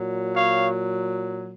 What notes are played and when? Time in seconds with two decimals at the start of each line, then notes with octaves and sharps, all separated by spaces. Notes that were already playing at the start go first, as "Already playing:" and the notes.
Already playing: A#2 F#3
0.36 C#5 F5